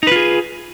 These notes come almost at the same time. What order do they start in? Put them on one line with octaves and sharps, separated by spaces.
D#4 B4 F4 G#4